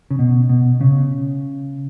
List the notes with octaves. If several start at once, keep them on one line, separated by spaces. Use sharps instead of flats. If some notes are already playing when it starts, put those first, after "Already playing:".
C#3
B2
B2
C#3